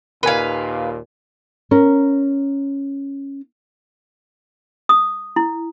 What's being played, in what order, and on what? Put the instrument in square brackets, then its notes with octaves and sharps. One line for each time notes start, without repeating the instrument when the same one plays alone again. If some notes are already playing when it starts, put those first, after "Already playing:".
[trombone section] D#2 A#2 [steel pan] A#4 G#5 [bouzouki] B4 F5
[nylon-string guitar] C#4 A#4
[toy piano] D#6
E4